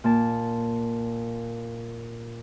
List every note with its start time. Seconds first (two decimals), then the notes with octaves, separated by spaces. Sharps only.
0.04 A#2 A5